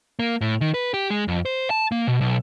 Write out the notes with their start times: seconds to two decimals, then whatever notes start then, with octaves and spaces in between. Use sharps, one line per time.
0.19 A#3
0.41 A2
0.61 D#3
0.74 B4
0.94 G4
1.10 G#3
1.28 F2
1.45 C5
1.70 A5
1.92 A#3
2.07 B2
2.21 B1